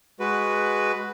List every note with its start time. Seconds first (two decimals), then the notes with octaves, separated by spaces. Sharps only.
0.20 G#3 F#4 B4